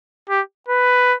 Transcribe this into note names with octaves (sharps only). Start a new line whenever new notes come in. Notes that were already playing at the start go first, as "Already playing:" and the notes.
G4
B4